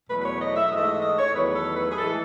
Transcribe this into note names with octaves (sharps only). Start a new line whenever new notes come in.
E2 B2 F#3 A3 B4
B4
C#5
D#5
E5
G#2 E3 A3 D#5
D#5
D#5
C#5
E2 D#3 F#3 A3 B4
A4
B4
G#4
A2 E3 G#3 A4